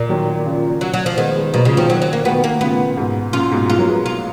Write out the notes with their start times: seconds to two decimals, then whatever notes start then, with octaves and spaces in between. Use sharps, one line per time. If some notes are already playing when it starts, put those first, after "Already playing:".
Already playing: A#2
0.09 D#3 F#3
0.46 C#3 F3
0.81 F#3
0.94 F#3
1.06 F3
1.17 D#3 G#3 B3
1.35 G#3 B3
1.53 B2 F#3 A#3
1.65 C#3 F3 G#3
1.77 D#3 F3 F#3
1.90 F#3
2.02 F#3
2.13 A#3
2.25 B2 D#3 B3
2.44 A#3
2.61 A#2 C#3 B3
2.97 G#2 B2
3.33 F#2 A#2 F4
3.52 G#2 B2
3.69 F3 G#3 F4
3.78 F#3 A#3
3.87 G#3 B3
4.06 F4